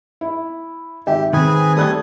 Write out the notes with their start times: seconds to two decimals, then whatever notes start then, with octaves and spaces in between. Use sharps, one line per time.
0.21 E4
1.07 G#1 G4 E5 G5
1.33 D#3 C4 G#4 B4 G#5
1.76 G3 A3 A4 D#6 F#6 G#6